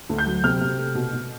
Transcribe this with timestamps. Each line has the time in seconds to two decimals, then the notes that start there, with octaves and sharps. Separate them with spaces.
0.09 D2
0.18 G6
0.26 F#3
0.44 C3 F6
0.61 C3
0.78 A3
0.95 B2
1.13 B2